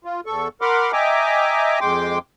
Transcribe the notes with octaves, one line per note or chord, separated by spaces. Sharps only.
F4
E2 A4 C#6
A#4 F#5 B5 C6 D6 F6
D#5 E5 G5 G#5 A#5 D6
F2 G#3 G5 C6 D6